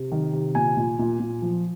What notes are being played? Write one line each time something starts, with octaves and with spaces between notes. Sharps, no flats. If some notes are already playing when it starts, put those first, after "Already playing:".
Already playing: C3
D#3
C3
A#2 G#5
A#2
A#2
A#2
F3